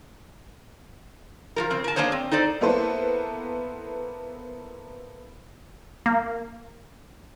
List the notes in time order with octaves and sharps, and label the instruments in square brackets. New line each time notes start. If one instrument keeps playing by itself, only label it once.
[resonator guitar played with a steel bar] F3 G3 A#4
C#3 C4
A#4 A5
A#3 D4 G#4 C5 C#5
C4
D#4 A4 C5 D5
[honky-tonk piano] A#3 B3 E4 A4 B4 C5
[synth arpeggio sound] A#3